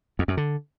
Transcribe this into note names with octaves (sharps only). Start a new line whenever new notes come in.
F2
F#2
D3